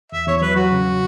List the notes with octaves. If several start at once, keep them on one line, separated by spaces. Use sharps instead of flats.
E2 E5
E2 C#5
C#5
F#3 B4
F#3 F#4
C#3